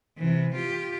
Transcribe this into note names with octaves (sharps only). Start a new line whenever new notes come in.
C3 E3
F4 G4